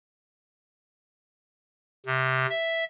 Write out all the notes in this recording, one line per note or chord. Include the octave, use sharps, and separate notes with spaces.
C3
E5